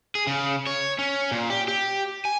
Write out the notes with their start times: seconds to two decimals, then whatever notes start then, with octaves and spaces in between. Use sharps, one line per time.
0.15 G#4
0.27 C#3
0.67 C#5
0.99 C#4
1.31 A#2
1.50 G4
1.68 G4
2.25 G#5